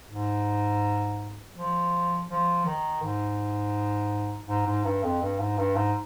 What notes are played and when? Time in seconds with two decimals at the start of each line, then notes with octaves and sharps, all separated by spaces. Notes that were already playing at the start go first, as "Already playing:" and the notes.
0.10 G#2
1.57 F3
2.29 F3
2.66 D#3
3.03 G#2
4.48 G#2
4.67 G#2
4.85 G2
5.03 F2
5.22 G2
5.39 G#2
5.58 G2
5.76 G#2